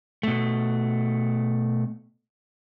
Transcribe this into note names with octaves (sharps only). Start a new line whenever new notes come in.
B2 A3